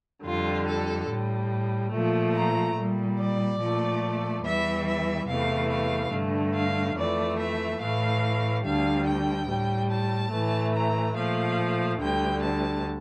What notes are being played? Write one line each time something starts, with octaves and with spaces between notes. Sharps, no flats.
F2 D3 G3 F4
A4
A2 G3
A#2 F3 A3
A#5
A#2 G3
D5
A#2 F3 A3
E2 E3 G3 E5
E5
E2 C3 E3 A3 F5
F5
G2 D3 A3
F5
F2 E3 A3 D5
E5
A2 E3 A3 F5
D2 D3 G3 F5
G5
A2 G3
A5
A2 E3 A3
A#5
A#2 F3 A3 F5
D2 D3 G3 G5
A5